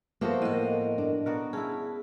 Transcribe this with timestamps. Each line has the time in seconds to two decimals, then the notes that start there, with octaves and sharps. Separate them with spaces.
0.21 F3 A#3 B3 F#4 A4 C5 E5
0.42 A2 A#4 D#5
0.98 D4
1.26 B3 F#4 A#4
1.53 C#4 E4 G#4 A5